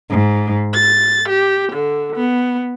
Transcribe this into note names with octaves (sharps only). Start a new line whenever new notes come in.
G#2
A6
G4
D3
B3